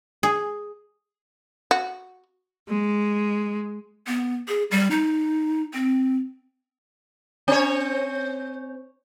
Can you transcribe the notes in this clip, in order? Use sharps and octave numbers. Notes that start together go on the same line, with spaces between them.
G#4
F#4
G#3
B3
G#4
G3
D#4
C4
C4 C#5